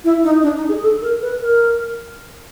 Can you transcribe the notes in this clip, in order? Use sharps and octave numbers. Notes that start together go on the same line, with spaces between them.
E4
D#4
D4
D#4
G#4
A4
A#4
B4
A#4